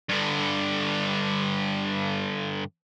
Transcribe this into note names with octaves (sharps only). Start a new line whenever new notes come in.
G2 D3